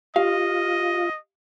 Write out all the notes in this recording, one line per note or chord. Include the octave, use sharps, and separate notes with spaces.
F4 G4 D#5 F5